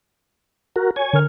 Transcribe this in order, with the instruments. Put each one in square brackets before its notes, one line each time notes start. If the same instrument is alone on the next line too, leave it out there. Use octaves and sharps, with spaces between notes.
[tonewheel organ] F#4 A#4
C#5 G#5
[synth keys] D3 A#4 F6